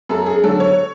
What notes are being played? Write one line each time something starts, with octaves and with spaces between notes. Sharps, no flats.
F#2 A4
G#4
D3 F#3 A4
C#5